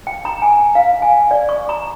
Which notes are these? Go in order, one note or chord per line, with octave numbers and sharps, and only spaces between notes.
G5
A#5
G#5
F5
G#5
D5
C#6
A#5